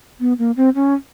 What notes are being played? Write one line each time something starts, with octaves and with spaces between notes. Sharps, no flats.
B3
A#3
C4
C#4